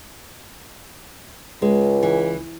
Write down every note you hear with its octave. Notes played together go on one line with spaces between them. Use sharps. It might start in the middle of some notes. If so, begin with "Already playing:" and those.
C#2 G#3
E3